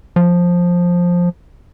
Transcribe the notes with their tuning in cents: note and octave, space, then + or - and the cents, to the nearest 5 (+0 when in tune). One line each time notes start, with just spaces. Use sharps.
F3 +10